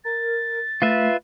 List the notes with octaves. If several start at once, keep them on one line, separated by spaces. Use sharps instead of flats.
A#4 A6
A3 F4 B4 E5